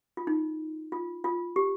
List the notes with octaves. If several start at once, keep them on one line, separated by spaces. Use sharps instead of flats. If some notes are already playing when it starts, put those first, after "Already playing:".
F4
D#4
F4
F4
G4